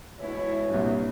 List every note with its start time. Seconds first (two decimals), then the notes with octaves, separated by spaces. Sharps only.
0.19 G#2 B2 E3 G#3 E4 C#5
0.70 C2 G2 A#2